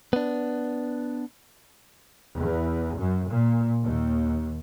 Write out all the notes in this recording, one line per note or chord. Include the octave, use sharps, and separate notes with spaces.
B3 D4
E2
F#2
A#2
D#2